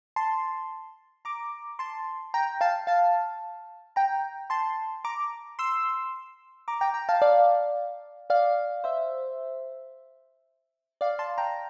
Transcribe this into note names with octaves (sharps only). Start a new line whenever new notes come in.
A5 C6
A#5 D6
A5 C6
G5 A#5
F5 A5
F5 A5
G5 A#5
A5 C6
A#5 D6
C6 E6
A#5 D6
G5 A#5
G5 A#5
F5 A5
D5 F5
D5 F5
C5 E5
D5 F5
A5 C6
G5 A#5